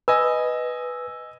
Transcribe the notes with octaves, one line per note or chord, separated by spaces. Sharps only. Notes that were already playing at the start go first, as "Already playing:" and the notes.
B4 D#5 G#5 E6